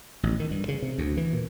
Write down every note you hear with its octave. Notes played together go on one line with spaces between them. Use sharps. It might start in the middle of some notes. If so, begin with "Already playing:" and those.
A1
D#3
G2
C#3
C3
D2
E3
A#2